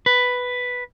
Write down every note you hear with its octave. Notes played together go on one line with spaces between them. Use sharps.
B4